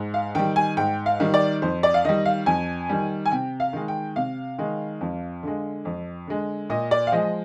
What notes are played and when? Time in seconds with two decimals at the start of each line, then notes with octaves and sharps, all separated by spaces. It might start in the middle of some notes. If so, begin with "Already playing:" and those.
Already playing: G#2
0.14 F5
0.35 D#3 G3 G5
0.56 G#5
0.77 G#2 G5
1.06 F5
1.20 D#3 G3
1.34 D5
1.62 F2 C5
1.83 D5
1.94 F5
2.05 D#3 G3 D#5
2.25 F5
2.46 F2 G#5
2.89 D#3 G3
3.26 G#5
3.31 C3 G5
3.60 F5
3.73 D#3 G#3
3.88 G5
4.16 C3 F5
4.58 D#3 G#3
5.01 F2
5.43 D3 G#3
5.85 F2
6.27 D3 G#3
6.70 A#2 D#5
6.91 D5
7.07 F5
7.12 F3 G#3 D#5